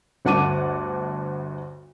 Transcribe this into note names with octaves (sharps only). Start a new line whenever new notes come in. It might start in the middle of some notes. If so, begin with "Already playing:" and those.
G1 D2 F#5 A5 D6 D#7